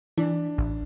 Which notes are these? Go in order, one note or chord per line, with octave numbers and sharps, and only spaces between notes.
E3 D4
A1